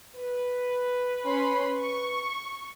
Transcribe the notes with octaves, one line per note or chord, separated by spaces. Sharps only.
B4
C#4 B5 C6
C#6